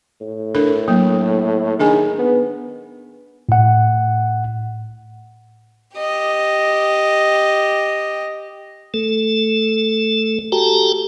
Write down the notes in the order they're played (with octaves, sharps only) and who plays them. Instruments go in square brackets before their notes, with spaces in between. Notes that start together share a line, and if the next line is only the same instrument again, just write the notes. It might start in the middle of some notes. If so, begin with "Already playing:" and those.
[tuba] A2
[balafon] D4 A4 A#4
F#3 A#3
[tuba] D#3 [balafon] D4 G#4 G#5
[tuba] B3
[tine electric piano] A2 F#5
[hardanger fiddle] G4 D#5
[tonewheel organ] A3 A4
F#4 G4 A4 G5 A5 A#5